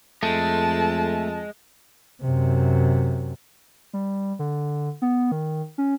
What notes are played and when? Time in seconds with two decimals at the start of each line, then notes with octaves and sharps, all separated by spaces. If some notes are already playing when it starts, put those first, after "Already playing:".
0.23 F2 G#3 A3 A5
2.22 F#2 C3
3.93 G3
4.39 D3
5.02 B3
5.32 D#3
5.78 C#4